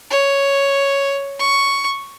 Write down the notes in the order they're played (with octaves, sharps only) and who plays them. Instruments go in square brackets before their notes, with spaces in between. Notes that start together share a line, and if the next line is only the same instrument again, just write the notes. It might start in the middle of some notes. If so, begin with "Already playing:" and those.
[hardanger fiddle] C#5
C#6